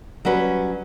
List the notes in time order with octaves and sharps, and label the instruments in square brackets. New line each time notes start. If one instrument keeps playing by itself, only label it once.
[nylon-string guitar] F#3 G3 C#4 B4